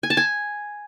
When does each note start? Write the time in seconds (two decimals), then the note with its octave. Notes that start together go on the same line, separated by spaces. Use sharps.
0.03 G#5
0.10 A5
0.17 G#5